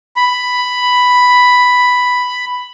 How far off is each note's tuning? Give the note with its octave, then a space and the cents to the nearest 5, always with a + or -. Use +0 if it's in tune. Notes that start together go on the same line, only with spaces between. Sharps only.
B5 +5